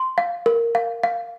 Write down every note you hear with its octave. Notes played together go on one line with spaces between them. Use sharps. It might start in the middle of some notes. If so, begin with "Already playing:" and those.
Already playing: C6
F5
A#4
F5
F5